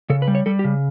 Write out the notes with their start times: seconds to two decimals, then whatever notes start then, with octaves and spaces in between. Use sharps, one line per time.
0.10 C#3 A4
0.22 B4
0.28 G3
0.35 C#5
0.46 G3 A4
0.59 G4
0.64 C#3